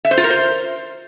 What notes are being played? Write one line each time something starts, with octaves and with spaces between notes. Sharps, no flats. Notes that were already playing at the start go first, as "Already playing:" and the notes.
E5
C5
F4
A#4
C5